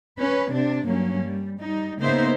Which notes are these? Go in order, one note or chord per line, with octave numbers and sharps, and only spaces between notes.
C#4 B4
C3 D4
G2 F#3 A#3 C#4
G3
G3 D#4
C#3 A#3 B3 D#4 C5 E5